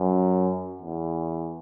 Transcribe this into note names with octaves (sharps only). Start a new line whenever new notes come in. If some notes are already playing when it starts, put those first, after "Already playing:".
Already playing: F#2
E2